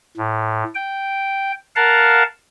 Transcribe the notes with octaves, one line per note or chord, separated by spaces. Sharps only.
A2
G5
A#4 F5 F#5 A5